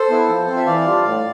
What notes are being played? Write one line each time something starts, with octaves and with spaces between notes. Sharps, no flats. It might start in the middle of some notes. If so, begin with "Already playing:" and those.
Already playing: A4 C5
B3 E4
F3
C4 F4
E5
E3 D5 F5
G3 D4 F4
A2